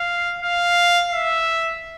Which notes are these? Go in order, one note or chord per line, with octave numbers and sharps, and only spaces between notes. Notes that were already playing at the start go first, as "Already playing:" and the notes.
Already playing: F5
F5
E5